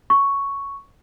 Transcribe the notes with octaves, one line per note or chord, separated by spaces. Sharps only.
C#6